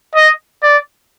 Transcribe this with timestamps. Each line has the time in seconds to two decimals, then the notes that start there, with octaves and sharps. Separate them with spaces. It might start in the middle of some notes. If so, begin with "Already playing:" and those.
0.15 D#5
0.63 D5